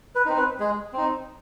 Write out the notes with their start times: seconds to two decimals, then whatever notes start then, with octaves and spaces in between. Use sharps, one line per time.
0.15 B4
0.26 C4 D#4
0.37 B4
0.60 G#3 G#4
0.93 C4 D#4